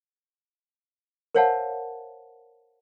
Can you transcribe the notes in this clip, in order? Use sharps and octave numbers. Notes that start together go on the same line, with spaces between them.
A#4 C5 C#5 F5 F#5 A5